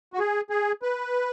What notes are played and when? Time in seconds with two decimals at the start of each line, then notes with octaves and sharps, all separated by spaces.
0.13 F#4
0.19 G#4
0.50 G#4
0.82 B4